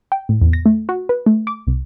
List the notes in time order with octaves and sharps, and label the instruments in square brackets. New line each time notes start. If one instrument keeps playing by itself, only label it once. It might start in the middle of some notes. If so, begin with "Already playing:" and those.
[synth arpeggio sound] G5
A2
E2
A#6
A3
F#4
B4
A3
D6
C2